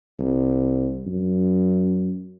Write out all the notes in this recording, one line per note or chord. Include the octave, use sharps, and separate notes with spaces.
C2
F#2